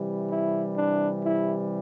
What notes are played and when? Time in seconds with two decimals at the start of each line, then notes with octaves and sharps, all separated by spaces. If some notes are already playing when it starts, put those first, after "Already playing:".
Already playing: C3 E3 G3
0.31 E4
0.77 D4
1.25 E4